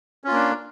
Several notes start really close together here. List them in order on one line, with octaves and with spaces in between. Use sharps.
C#4 F4 A#3 D4